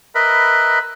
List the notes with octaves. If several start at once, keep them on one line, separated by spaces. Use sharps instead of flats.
A#4 B4 D#5 E5 B5